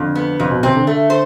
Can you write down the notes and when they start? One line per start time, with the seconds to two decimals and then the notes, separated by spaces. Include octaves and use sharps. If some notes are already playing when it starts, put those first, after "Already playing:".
Already playing: F2 D3
0.15 B3
0.40 F2 C3
0.51 B2
0.63 C3 C4
0.75 D3
0.87 A3
1.10 C5